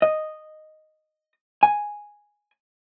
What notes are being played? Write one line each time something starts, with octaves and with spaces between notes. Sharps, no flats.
D#5
G#5